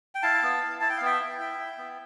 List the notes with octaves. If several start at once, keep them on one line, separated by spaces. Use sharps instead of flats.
G5
E4 F5 A5
B3
E4
E4 A5
G5
F5
B3 E5 G5
E4
E4
E4
B3